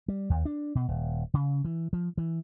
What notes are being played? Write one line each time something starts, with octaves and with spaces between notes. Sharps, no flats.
G3
D#2
D4
B2
D#1
C#3
E3
F3
E3